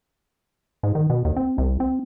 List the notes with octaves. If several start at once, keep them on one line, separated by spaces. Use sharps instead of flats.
G#2
D#3
B2
D#2
C4
C2
C4